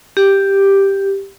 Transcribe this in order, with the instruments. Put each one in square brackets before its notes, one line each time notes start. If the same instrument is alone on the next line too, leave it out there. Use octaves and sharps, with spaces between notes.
[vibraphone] G4